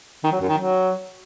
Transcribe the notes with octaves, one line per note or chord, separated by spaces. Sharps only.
D#3
F#3
F#2
D#3
F#3